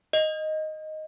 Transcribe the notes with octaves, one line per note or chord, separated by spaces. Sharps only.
D#5